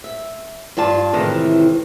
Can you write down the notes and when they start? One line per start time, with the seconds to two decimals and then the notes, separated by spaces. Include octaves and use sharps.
0.04 E5
0.77 G2 F4 D5 A5
1.13 F2 A2 C3 D#3 E3 G#3